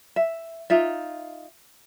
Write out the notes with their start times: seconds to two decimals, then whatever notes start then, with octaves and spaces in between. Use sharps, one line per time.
0.16 E5
0.70 D#4 F4 E5